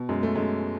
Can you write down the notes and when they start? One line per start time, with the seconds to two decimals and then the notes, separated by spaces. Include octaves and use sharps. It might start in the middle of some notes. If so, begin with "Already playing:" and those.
Already playing: B2
0.09 F#2 G#3
0.23 A3
0.36 F#2 G#3